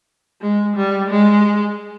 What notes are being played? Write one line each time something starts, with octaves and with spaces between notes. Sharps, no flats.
G#3
G3
G#3